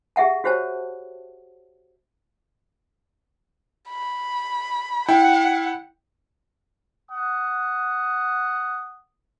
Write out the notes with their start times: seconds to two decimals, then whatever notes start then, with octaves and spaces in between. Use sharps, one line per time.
0.16 G4 G#4 E5 F#5 A5
0.44 F#4 G4 C5 C#5 A5
3.89 B5
5.09 E4 F#5 G5
7.11 F#5 D#6